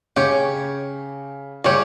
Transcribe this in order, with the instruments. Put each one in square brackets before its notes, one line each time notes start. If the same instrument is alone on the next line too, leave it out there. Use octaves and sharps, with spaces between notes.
[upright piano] C#3 [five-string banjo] C#4 G4 C#5
[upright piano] C#3 [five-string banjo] G3 C#4 G4 C#5